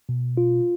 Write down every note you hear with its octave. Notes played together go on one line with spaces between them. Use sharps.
B2
F4